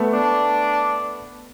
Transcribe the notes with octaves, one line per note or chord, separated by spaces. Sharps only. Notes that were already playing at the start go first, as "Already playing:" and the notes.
Already playing: A3 B3
D4